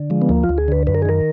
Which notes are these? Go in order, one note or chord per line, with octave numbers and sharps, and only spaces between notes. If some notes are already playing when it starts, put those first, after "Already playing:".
Already playing: D3
F3 G#3
B3
D2 A#3
F4
D2
G#4
D3 B4
F#2 B4
A#4
G#4
D#3 A#4